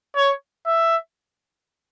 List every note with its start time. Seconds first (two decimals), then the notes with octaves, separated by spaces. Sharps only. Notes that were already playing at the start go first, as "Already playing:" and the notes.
0.16 C#5
0.66 E5